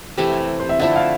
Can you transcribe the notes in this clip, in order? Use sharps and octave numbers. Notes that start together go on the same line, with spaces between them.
C3 E3 A3 E4 G4
C5
E5
D3 F3 A3 E4 E5
F5